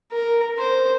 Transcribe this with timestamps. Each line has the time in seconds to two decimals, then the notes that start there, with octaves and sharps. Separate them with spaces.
0.12 A#4
0.58 C5